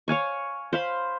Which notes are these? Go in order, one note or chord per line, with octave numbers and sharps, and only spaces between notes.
C#5 F5 G#5 C#6
C5 F5 B5